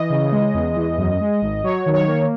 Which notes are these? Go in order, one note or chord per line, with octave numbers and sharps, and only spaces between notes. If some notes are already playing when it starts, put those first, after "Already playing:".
Already playing: E3 D#5
C#3
G#3
E2
E3
F#2
G#3
G#1
F#3 C#5
D#3
C#5
A#3